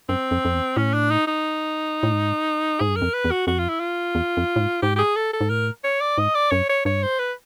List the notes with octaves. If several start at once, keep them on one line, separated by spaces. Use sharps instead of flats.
F#2 C4
F2
F2
E2
A2 C#4
D4
D#4
D#4
A2
G#2
G#2 G#4
G2
F#2 A#4
F2
B4
E2
F#4
F2 F#4
F4
E4
F4
E2
F2
A2
G#2
G#2 G4
G4
G#4
A4
A4
G#2
A2 A#4
C#5
D5
G#2 D#5
D5
F#2 C#5
C#5
G2 C#5
C5
B4